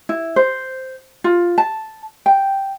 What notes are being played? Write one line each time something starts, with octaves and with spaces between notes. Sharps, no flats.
E4
C5
F4
A5
G5